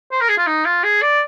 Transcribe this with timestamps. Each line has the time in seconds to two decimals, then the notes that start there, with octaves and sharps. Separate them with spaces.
0.11 C5
0.20 A#4
0.29 G#4
0.37 F4
0.47 D#4
0.65 F4
0.83 G#4
1.02 D5